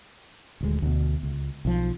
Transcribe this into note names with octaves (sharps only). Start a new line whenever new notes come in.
D#1 D2 G#3
D2 B2
C#2
B1 F3